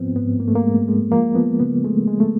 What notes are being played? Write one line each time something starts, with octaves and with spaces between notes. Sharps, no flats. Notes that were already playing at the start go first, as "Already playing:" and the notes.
Already playing: G#2 F3 B3 C4
G#2 B3
G#2 A#3
A3
A#3
G#3
G#3
F3 A#3
F3 B3
C#3 B3
G#3 A3
G#3
A3